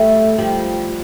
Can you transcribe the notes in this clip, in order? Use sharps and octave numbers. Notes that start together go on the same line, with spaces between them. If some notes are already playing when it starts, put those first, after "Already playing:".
Already playing: G3 A3
F3 G3